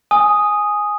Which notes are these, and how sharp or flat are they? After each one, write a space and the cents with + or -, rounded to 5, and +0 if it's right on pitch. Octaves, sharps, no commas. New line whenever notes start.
G#5 +0 D#6 +0